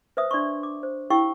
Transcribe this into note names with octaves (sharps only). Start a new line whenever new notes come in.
B4 C5 E5 D#6
D4 D5 C6 C#6
D6
C5
E4 G4 F5 G5 C#6 E6